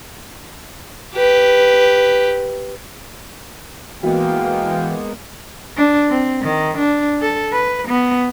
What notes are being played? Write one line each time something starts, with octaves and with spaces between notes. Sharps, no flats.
G4 B4
E3 G#3 A#3 B3 F#4 F5 G5
D4
C4
D#3
D4
A4
B4
B3